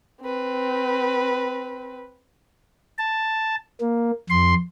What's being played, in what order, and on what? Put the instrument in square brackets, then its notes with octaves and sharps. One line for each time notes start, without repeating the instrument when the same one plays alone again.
[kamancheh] C4 B4
[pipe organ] A5
A#3
F2 C6